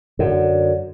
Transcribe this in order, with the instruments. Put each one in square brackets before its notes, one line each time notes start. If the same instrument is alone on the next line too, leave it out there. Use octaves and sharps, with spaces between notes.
[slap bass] F#2 D3